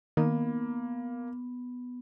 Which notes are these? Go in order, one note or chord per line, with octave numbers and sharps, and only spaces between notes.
D#3 A#3 B3